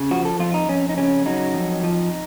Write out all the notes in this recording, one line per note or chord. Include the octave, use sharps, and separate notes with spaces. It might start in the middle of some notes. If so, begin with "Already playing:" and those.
Already playing: C#3
F3 F#4
A4
F2 F4
D#4
F2 C#4
D#4
C#3 C#4
F#3 D#4
F2
F3